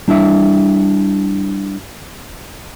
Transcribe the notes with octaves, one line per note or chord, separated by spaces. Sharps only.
G3 D4 E4 E5